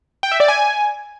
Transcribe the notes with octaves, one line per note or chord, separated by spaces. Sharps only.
G5
E5
D5
G#5